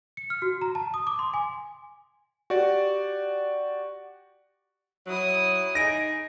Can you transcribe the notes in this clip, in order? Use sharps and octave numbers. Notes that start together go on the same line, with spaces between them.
C#7
F6
F#4
A#5
A5
D#6
D6
C6
G#5
F#4 G4 D5
F#3 E4 D#6
D#4 G#4 A#6 D7